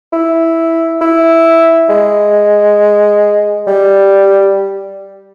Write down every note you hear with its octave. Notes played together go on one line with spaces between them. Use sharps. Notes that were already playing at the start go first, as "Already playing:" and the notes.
E4
E4
G#3
G3